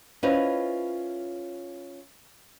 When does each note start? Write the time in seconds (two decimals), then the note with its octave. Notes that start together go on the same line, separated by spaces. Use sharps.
0.23 C#4 E4 F4 B4 C5 D#5